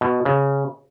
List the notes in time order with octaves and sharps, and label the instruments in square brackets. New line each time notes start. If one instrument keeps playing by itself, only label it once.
[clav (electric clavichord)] B2
C#3